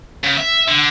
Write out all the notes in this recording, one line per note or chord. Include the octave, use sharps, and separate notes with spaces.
C#3
E5
D3